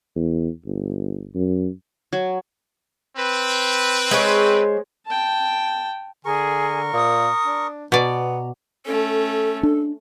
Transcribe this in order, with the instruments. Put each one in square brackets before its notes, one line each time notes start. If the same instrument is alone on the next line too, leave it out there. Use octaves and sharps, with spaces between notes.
[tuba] E2
G1
F#2
[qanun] F#3
[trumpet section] C4 B4
[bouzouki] G#3 C5 C#5
[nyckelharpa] G5 A5
[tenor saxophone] D3 [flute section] G#4 G#5 [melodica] A#4 C#6
[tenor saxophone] A#2 [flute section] D#6
[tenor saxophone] D4
[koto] B2 D5 [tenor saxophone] B3 [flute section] A#5
[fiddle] A3 C#4 [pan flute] A4
[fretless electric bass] D4